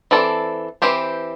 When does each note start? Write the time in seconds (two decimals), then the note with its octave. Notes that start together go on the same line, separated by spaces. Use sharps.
0.11 E3 C4 A4 D5
0.82 E3 C4 G4 C5